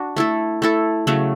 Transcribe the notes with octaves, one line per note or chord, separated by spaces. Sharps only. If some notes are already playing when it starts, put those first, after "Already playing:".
Already playing: D4 F#4
A3 E4 A4
A3 E4 A4
C#3 F#3 A3